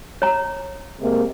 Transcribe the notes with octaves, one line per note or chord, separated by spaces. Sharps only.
C#5 A#5
C3 G#3 A#3